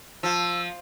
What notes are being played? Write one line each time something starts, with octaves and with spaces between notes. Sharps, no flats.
F3 E6